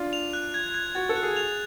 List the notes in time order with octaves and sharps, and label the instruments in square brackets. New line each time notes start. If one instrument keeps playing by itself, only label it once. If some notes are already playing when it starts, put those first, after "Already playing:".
Already playing: [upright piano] D4 F4
[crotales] F7
F#6
G#6
G#6
[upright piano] F#4 [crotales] A6
[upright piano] A4
[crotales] F#6
[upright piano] G#4
[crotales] F7